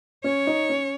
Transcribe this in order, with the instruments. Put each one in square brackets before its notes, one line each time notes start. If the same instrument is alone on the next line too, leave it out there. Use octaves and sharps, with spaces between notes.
[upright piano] C#4 [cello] C#5
[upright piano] D#4
C#4